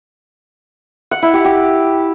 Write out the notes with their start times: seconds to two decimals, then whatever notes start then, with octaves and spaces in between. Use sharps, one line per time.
1.11 F#5
1.22 E4
1.34 G4
1.45 G4